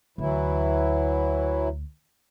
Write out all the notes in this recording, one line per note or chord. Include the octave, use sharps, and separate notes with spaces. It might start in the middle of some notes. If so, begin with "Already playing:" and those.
D2 E3 F#3 E4